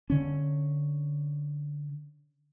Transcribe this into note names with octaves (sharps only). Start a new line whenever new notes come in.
D3 C#4